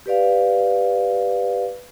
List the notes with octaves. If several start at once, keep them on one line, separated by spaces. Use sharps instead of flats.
G4 B4 D5 F5